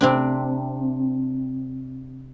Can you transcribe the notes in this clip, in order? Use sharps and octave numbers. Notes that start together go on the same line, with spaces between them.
C3 C4 D4